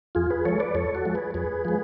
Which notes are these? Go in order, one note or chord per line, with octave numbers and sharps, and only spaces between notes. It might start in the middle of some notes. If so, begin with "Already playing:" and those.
F2 F4 G#4
G#4 B4
F3 G#3 A4 C#5
B4 D5
F2 A4 C#5
F#4 A4
F3 G#3
G#4 B4
F2 G#4 B4
F3 G#3